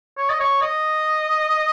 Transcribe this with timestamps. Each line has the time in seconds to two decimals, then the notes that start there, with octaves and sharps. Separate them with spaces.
0.18 C#5
0.30 D#5
0.40 C#5
0.62 D#5